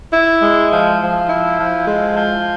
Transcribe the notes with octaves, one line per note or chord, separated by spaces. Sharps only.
E4
G#3
F3
F3
E4
F3
G#3
F3